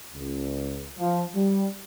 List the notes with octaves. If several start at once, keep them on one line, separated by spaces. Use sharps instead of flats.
C#2
F3
G3